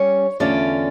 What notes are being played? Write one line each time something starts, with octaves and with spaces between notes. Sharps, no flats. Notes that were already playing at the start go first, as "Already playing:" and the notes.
Already playing: G3 C#4 C#5
E2 D3 A3 C#4 F4 D5